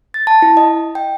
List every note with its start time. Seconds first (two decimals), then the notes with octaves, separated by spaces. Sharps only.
0.14 A6
0.27 A5
0.42 E4
0.57 D#5
0.95 G5